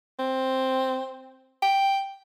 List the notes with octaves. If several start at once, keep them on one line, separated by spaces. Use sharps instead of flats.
C4
G5